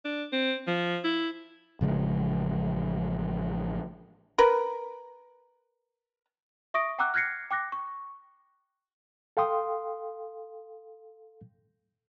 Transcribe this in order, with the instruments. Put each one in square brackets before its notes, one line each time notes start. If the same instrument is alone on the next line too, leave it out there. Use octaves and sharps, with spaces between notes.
[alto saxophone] D4
C4
F3
E4
[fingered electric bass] A1 C#3 F3 G#3
[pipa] A#4 B4
[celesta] E5 C#6 D#6 A#6 D7
F#5 G5 A#5 D6 E6 F#6
F6 F#6 G#6 A#6 C7 C#7
G5 D6 F#6 A#6
C#6
[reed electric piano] A4 F5 G5 C6 D#6